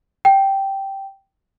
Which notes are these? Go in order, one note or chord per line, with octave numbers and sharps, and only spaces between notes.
G5